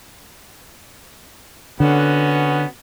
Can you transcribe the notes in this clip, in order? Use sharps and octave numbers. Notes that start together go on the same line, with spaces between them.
D3 B3 C#4 F#4